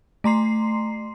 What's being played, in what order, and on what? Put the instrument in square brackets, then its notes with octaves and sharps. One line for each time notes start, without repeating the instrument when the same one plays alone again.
[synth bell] A3 A#5 C6 C7